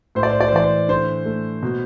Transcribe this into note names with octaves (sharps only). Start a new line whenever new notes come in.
A2 C5
D5
C5
D5
C5
E3 D5
C5
D3 C5
A3
B2